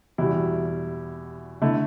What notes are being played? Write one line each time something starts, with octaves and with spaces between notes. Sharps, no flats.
E2 B2 G3 E4
D3 A3 E4